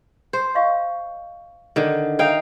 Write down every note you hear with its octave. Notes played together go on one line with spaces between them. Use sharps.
C5
D#5 F5 C#6
D3 D#3
D#4 C#5 E5 F5 G5